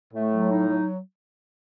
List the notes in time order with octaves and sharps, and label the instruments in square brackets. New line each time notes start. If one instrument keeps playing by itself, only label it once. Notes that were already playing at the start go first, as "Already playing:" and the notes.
[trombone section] A2 [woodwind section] A3
[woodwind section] F#3
D#4
F#3